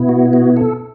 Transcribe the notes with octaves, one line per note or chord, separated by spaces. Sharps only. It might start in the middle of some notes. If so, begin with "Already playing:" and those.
Already playing: B2 B3 E4
F#4
F#4
A4